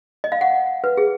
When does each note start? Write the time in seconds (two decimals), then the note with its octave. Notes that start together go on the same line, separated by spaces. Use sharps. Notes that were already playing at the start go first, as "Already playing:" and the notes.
0.24 D#5
0.32 F5
0.41 F#5
0.84 B4
0.97 G#4